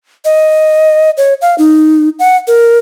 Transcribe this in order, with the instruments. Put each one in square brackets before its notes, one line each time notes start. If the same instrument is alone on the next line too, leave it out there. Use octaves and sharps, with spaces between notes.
[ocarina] D#5
C#5
F5
D#4
F#5
A#4